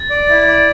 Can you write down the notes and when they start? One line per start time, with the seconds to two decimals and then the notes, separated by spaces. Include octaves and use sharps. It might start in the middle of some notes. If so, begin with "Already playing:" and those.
Already playing: A6
0.10 D5
0.29 E4
0.47 D5